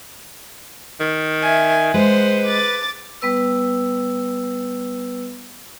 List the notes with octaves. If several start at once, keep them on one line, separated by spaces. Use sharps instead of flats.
D#3
E5 G#5
G#3 B4 C5 F#5
D6 A6
G3 B3 B4 E6